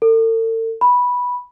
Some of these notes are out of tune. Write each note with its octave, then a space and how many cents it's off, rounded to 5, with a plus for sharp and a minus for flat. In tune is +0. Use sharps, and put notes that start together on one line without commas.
A4 +45
B5 -10